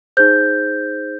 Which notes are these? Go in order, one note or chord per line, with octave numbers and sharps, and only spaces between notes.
D#4 G#4 C5 G6